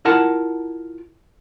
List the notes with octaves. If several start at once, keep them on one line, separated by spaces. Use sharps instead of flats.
E4 F4 A#4 F#5 A5 A#5